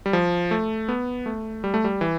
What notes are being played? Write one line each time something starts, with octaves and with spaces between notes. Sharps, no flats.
G3
F3
A3
B3
A3
G3
A3
G3
E3